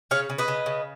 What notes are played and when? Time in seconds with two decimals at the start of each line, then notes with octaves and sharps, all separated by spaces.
0.11 C#3 C#5 F5
0.30 C#3
0.38 B4 D#5
0.48 C#3
0.66 C#3